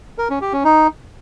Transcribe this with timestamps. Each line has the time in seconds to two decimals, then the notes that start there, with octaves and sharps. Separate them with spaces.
0.18 A#4
0.30 C#4
0.41 G4
0.53 C#4
0.64 D#4